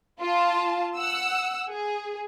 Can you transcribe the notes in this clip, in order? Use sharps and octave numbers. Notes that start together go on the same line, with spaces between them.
F4 A5
F#5 E6
G#4